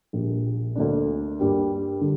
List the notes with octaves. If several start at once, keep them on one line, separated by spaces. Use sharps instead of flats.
A#1 A#2 G3 A#3
D2 D3 A#3 D4
G2 G3 A#3 G4
D3 G3